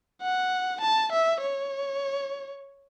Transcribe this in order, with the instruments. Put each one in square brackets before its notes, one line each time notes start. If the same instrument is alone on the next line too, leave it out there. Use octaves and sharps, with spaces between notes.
[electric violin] F#5
A5
E5
C#5